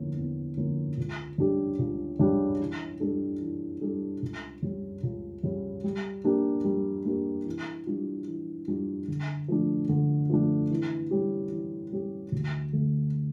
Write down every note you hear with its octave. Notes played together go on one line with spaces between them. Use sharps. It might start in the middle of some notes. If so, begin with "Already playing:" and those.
Already playing: E2 D3 F3 A#3 C#4
E2
D3 F3 A#3 C#4
C#2
C#3 G3 D4 G4
C#2
C#3 G3 D4 G4
E3
G3 D4 A4
E3
G3 D4 A4
C#2
C#3 G3 C#4
C#2
C#3 G3 C#4
G3
A#3 D4 G4
G3
A#3 D4 G4
E3
G3 D4 F4
E3
G3 D4 F4
D3
F3 A3 D4
D3
F3 A3 D4
E3
G3 C#4 G4
E3
G3 C#4 G4
D2
D3 A3